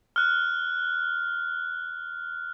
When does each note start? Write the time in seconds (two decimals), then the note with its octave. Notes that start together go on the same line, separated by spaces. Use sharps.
0.16 F6 F#6